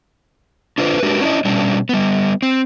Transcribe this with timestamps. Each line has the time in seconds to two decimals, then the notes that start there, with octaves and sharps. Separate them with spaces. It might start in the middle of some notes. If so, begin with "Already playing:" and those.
0.78 D4 F4 A4 B4 C5
1.03 G#3 D4 F#4 G4 A#4 B4
1.21 C#4 D4 E4 D#5
1.45 B2 G3 C#4 D4
1.89 G3 B3
2.42 C4